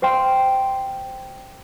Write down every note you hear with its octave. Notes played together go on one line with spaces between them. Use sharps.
C5 F5 G5 C6